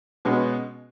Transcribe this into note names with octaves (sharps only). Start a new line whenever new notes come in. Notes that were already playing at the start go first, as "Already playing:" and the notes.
B2 G#3 C#4 F#4 B4